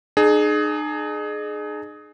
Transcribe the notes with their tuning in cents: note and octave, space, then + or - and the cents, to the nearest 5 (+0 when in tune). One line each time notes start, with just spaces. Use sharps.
D#4 -45 G#4 +20